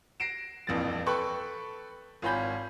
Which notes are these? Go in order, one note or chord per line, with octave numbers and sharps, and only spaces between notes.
A#6 C7 D7 E7
D#1 A#1 F2 E3 A6
A4 B4 G5 B5 C#6 F#6
G#1 F4 C#5 G#5 B5 G6